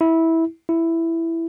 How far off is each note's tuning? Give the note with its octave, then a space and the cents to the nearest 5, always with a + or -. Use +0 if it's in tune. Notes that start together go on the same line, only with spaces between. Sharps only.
E4 -15
E4 +5